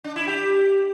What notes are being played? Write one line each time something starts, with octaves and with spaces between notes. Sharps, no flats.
D4
E4
G4